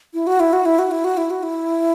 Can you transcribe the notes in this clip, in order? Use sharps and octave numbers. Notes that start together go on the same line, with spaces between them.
E4
F#4
E4
F#4
E4
F#4
E4
F#4
E4
F#4
E4